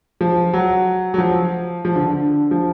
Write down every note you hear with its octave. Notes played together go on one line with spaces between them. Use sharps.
F3
F#3
F#3
F3
F3
D3
D3
F3